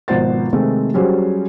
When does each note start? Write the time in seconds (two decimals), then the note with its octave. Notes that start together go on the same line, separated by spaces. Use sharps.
0.08 G#1 B2 F3 C5 F#5 A6
0.53 C3 D#3 G#3 A3 C4
0.94 F#3 G3 C#4 F#4 G#4 C5